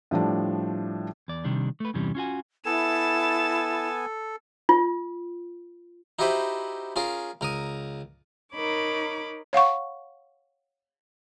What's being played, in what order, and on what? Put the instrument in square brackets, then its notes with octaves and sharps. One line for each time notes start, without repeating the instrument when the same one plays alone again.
[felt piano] A2 F3 G3 D4
[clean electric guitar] E2 D5
C3 D#3 G3 D4
A3 B4
E2 G2 C3 E3 G3 C#4
C#4 F4 F#4 G#5
[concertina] B3 G#5 [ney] E4 [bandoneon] A4 [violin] A6 E7
[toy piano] F4
[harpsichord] D#4 E4 F#4 G4 B4 C5
C#4 F4 G#4 A#4
C#2 A#4 A#5 D#6
[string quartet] D#4 A#4 C#5 B5 D6
[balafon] C#5 F5 F#5 C#6